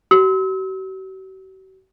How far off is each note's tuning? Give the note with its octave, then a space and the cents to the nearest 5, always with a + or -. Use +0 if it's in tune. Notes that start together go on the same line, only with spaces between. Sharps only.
F#4 +45 E6 -35